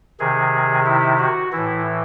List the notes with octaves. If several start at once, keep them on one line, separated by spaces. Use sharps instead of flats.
C3 D#3 G#4
E4
F#4
A2 E3 E4